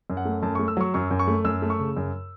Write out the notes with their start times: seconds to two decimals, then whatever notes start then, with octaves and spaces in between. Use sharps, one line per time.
0.10 F#2
0.17 F#5
0.25 A3
0.43 F#2 A5
0.55 C#6
0.59 A3
0.68 E6
0.77 F#3 C#6
0.94 F#2 C#6
1.11 F#2
1.19 C#6
1.27 A3
1.45 F#2 E6
1.62 A3
1.70 C#6
1.79 C#3
1.97 F#2